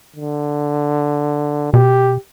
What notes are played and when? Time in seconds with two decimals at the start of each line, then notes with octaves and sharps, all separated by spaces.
0.16 D3
1.74 B2 G4